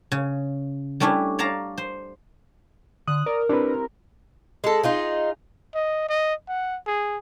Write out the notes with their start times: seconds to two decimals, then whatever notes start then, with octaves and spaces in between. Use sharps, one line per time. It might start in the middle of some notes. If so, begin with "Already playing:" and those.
0.12 C#3
1.00 G3 A3 C#4 D4 E4
1.39 C#5 D5 F5 A5 A#5
1.78 C5
3.08 D3 D#6 F#6
3.26 A#4 D5
3.49 C4 D4 E4 G4 B4
4.64 G#3 A4
4.83 D#4 F4 G#4
5.75 D#5
6.09 D#5
6.48 F#5
6.87 G#4